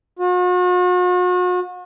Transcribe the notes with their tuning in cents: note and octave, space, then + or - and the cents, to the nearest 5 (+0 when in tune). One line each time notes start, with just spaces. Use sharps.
F#4 -45